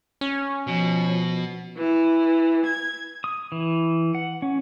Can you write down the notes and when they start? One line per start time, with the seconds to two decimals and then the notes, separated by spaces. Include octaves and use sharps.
0.21 C#4
0.67 B2 F3
1.76 E3
2.65 G#6
3.24 D#6
3.52 E3
4.15 F#5
4.42 C#4